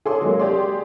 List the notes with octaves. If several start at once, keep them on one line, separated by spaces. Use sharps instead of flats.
G#4 A4 C#5 C6 D6
F#3 G#3 A#3
G4 G#4 D5 C6